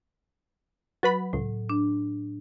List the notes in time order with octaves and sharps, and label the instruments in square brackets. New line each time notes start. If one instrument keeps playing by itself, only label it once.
[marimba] F#3 [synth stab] F#4 B4 B5
[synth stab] C#2 [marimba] A2
[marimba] D4